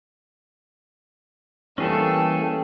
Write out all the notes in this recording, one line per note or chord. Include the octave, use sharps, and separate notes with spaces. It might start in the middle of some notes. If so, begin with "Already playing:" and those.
E3 G3 A3 A#3 C#4 G#4 A4 G5